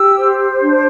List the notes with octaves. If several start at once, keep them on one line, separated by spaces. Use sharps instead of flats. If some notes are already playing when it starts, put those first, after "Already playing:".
Already playing: G4 E6
C5
D4